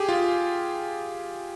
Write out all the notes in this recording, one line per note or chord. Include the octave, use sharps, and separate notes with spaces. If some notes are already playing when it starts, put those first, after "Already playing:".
Already playing: G4 G#4
F4